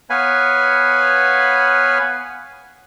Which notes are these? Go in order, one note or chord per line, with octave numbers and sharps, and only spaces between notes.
B3 B4 C#5 F5 G#5 B5